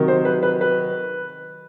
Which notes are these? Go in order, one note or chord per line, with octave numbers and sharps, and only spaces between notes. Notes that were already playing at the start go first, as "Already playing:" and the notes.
Already playing: C3 D#3 F#3
C5
B4
B4
B4